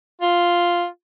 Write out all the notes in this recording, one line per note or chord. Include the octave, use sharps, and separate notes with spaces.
F4